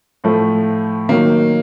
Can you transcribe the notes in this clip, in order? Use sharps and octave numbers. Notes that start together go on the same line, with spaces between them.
A2 F3 A3
D#3 F#3 A#3